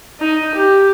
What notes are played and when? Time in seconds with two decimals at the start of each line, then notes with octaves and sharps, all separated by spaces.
0.20 D#4
0.55 G4